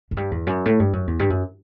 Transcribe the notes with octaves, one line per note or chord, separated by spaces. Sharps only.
F#2
G2
E2
F#2
A2
G2
F#2
E2
G2
F#2